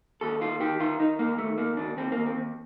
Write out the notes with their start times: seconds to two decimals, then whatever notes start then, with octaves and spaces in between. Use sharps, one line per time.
0.21 D#2 A4
0.41 D#3 F4
0.60 D#3 G4
0.80 D#3 F4
1.00 D#3 D#4
1.19 D#2 A#3
1.38 D#2 A3
1.58 D#3 A#3
1.77 D#2 D4
1.97 D#2 C4
2.12 A#3
2.17 D#2
2.26 C4
2.36 D#2